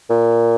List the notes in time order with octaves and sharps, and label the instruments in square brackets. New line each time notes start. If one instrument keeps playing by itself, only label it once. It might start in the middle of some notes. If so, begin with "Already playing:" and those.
[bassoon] A#2